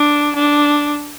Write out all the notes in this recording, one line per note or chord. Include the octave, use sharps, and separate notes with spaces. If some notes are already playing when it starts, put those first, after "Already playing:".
Already playing: D4
D4